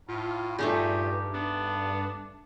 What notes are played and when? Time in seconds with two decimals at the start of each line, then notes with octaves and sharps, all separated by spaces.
0.08 A2 F4
0.58 G2 A#2 A3 D#4 G4 G#4
1.34 B3 D4